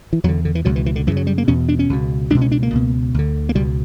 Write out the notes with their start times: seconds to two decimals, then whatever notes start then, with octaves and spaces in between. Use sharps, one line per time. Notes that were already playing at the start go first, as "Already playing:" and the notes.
0.13 E3
0.24 E2 F#3
0.28 D3
0.45 D3
0.55 E3
0.65 C#2 B2 F#3
0.76 E3
0.86 E3
0.96 D3
1.07 F#2 C#3 E3
1.17 F#3
1.27 G3
1.38 A#3
1.48 E2 B2 C#4
1.69 D4
1.79 C#4
1.89 C#2 B2
2.30 C#2 D4
2.35 B2
2.41 C#4
2.52 D4
2.63 A#3
2.73 C#2 B2
3.14 D2 D3
3.49 A#3
3.55 C#2 B2 G3